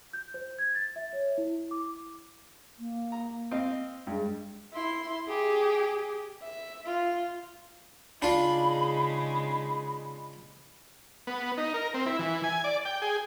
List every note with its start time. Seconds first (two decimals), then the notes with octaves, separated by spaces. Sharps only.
0.13 G6
0.34 C5
0.59 G#6
0.75 A6
0.96 E5
1.13 C#5
1.38 E4
1.71 D6
2.79 A#3
3.12 A#5
3.51 C4 D#5 F5
4.07 G2 G#3
4.73 E4 C6
5.28 G4 G#4
6.42 E5
6.86 F4
8.22 C#3 G#3 D4 D#4 F4 B5
11.27 B3
11.58 D#4
11.74 A#4
11.94 C4
12.06 E4
12.19 E3
12.44 G#5
12.64 D5
12.85 G5
13.02 G#4